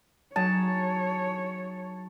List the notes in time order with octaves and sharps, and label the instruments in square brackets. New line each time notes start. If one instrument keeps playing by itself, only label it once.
[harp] F#3 D#4 G#4 [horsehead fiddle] C#5 [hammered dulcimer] A5